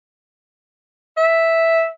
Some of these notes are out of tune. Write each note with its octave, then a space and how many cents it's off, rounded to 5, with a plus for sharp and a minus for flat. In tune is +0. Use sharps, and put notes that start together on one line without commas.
E5 -5